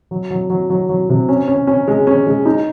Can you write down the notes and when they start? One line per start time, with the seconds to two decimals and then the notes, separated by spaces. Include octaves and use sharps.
0.11 F#3
0.31 F#3
0.50 F#3
0.70 F#3
0.89 F#3
1.10 C3
1.29 C#4
1.48 C#4
1.67 C#4
1.88 G#3
2.07 C#4
2.27 G#3
2.45 D#4